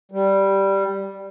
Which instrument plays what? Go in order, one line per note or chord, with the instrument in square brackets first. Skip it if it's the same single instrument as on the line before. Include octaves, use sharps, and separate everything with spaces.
[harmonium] G3